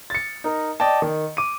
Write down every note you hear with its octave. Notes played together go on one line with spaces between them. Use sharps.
A6 C#7
D#4 A#4
D5 D#5 G5 A5
D#3
D6 D#7